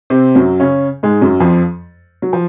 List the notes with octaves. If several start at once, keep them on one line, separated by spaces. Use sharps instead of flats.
C3 C4
F#2 F#3
C#3 C#4
G#2 G#3
F#2 F#3
F2 F3
F#3
F3